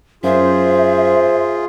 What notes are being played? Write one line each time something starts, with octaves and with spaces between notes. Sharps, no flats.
F#2 F4 G#4 C5 E5